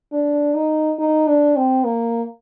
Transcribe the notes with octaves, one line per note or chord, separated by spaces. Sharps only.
D4
D#4
D#4
D4
C4
A#3